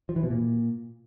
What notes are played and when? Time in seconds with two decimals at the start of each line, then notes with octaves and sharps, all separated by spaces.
0.09 F3
0.16 E3
0.23 B2
0.30 A#2